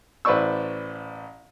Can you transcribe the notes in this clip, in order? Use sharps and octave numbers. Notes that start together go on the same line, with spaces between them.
A1 B4 C5 D5 C#6 E6